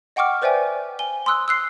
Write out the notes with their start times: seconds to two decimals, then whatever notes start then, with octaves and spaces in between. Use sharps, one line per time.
0.16 D#5 F#5 G5 C#6 D6 F6
0.42 B4 C5 D5 E5 G5 G#5
0.99 G#5 G7
1.26 C6 D#6 E6 F#6
1.48 E6 F#6 C7